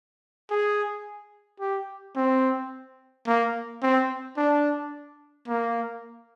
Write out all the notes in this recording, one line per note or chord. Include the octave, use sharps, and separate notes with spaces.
G#4
G4
C4
A#3
C4
D4
A#3